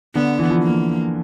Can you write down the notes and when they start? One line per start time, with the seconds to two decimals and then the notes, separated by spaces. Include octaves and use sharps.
0.14 D3 B3
0.39 E3
0.50 F3
0.63 A#3